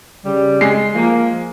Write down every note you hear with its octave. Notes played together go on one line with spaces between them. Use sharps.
C#3 G3
G#3 C7
F3 A#3